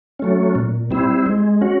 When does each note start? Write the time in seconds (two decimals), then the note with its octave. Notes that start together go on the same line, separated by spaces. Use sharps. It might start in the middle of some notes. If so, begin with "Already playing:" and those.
0.19 F#3 A3 C#4
0.55 A#2
0.91 G3 C4 E4
1.26 G#3
1.61 C#4 F#4